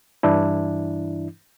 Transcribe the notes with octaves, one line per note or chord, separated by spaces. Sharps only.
G2 E3 D4 E4